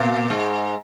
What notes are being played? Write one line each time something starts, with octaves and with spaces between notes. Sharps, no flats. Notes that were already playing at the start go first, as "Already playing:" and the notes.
Already playing: A#2 A#3
G#2 G#3